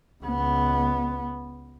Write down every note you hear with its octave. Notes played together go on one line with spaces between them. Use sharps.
C#2 B3